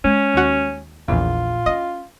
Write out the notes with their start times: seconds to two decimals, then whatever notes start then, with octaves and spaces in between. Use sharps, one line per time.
0.04 G#3 C#4
0.34 D#2 F#4
1.08 A#1 E2 A#2 F4
1.66 C#4 D#5